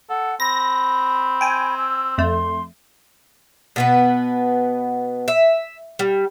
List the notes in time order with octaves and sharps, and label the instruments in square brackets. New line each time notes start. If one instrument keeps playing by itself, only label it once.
[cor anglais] A4 [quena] F#5
[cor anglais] C4 [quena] B5 [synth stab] A#6
[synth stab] G5 G#5
[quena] E6
[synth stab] F2 A3 [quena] C6
[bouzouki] B2 B3 B4
E5
G3